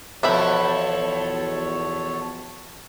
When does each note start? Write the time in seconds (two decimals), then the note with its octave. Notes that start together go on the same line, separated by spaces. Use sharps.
0.23 E2 B2 F3 B3 A4 C#5 E5 B5